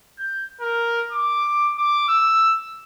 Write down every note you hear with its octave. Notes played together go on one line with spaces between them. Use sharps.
G6
A#4
D6
D6
E6